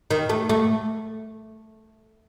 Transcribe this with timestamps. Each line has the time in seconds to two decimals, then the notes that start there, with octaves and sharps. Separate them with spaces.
0.11 D#3
0.29 A3
0.49 A3